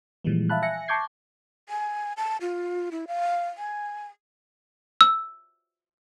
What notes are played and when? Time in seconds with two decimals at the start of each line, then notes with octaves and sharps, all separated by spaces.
0.24 A#2 E3 F3 G3 G#3
0.49 E5 F5 A5 B5 F#6
0.62 E5 G#5 F#6 A#6 C#7
0.88 A5 C#6 D6 G6 G#6 C7
1.69 G#5
2.17 A5
2.41 F4
2.92 E4
3.08 F5
3.58 G#5
5.01 E6